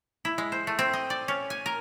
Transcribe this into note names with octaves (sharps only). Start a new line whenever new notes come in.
E4
G#3
C5
A3
C4
D#5
D5
C#4
G#5
A#4